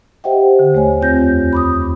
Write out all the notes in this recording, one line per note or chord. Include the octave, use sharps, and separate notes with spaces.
G4 C5 D#5 E5 F#5 G5
D3
D#2 A3 C#5 G#5
F2 C4 F4 G6 A#6
B5 D6 D#6
D#2